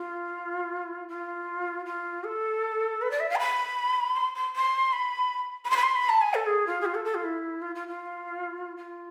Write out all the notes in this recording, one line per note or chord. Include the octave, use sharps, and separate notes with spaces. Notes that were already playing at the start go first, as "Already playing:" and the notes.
Already playing: F4
F4
F4
A4
B4
D5
E5
F5
C6
B5
C6
C6
C6
B5
B5
C6
B5
C6
B5
A5
G#5
A4
G#4
F4
G#4
F4
A4
A4
F4
E4
F4
F4
F4
F4